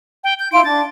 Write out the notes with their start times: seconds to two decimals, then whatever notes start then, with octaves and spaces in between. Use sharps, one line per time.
0.24 G5
0.40 G6
0.52 E4 F5 C6 D7
0.65 D4 A6